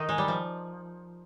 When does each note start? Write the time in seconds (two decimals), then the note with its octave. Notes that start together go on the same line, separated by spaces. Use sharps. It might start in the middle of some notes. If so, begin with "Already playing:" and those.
Already playing: D#3 D#4
0.09 G#3
0.18 G3
0.28 F3